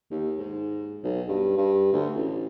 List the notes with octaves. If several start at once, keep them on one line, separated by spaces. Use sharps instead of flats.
D#2
G#2
B1
G2
G2
D2
A1